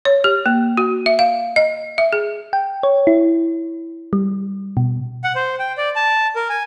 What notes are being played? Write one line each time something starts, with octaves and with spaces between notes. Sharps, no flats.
C#5
G4
A#3
F#4
E5
F5
D#5
E5
G#4
G5
C#5
E4
G3
B2
F#5
C5
G5
D5
A5
A#4
G#5